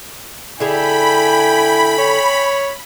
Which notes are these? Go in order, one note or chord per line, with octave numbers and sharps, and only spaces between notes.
D3 E4 G#4 G5 G#5 B5
C#5